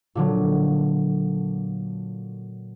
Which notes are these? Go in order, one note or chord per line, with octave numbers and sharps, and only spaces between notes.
A#2 D3 F#3